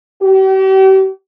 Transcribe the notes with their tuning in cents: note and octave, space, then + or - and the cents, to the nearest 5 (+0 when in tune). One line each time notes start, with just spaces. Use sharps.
G4 -40